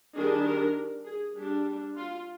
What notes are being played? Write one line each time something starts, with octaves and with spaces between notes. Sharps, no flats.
D#3 G3 D4 G#4
A#4
G#4
G3 D4 G4
F4